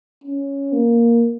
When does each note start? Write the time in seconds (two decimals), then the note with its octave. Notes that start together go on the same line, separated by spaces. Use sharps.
0.24 C#4
0.73 A#3